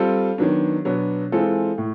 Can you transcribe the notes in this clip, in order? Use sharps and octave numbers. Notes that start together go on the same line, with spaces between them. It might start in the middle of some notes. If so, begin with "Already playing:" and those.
Already playing: G3 C4 F4 A4
D#3 F#3 B3 D4
B2 F#3 B3 D4
E3 G#3 C4 F4 A4
A2